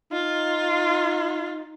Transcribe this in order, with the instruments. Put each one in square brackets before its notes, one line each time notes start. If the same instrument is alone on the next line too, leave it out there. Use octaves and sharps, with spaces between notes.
[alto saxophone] D#4 [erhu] F4